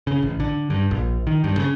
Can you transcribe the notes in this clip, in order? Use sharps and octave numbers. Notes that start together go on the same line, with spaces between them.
C#3
A1
D3
G2
A#1
D#3
G2
C#3